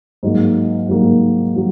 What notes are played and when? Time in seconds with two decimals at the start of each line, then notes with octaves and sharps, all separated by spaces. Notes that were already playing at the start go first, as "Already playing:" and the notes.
0.23 G#2 F#3 A#3
0.89 G#2 F#3 A#3
1.56 F#3